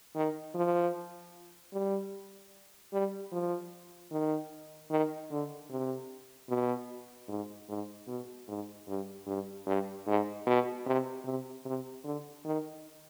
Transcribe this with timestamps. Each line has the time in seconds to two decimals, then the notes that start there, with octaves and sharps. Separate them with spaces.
0.15 D#3
0.55 F3
1.73 G3
2.93 G3
3.32 F3
4.12 D#3
4.91 D#3
5.31 D3
5.71 C3
6.49 B2
7.28 G#2
7.69 G#2
8.08 B2
8.48 G#2
8.88 G2
9.27 G2
9.67 G2
10.07 G#2
10.47 B2
10.86 C3
11.25 C3
11.65 C3
12.04 D3
12.45 D#3